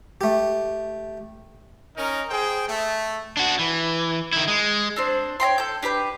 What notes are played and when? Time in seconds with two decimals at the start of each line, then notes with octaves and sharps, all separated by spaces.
0.21 A3 G4
1.97 C#4 D#4 A#4
2.30 G#4 C5 G5
2.69 A3
3.37 D4 F#4
3.59 E3
4.33 D#3 E4
4.48 G#3
4.96 C4 D4 C5
5.40 C#5 D#5 G5 C6
5.58 A4 G6
5.83 D4 G4 B4 G6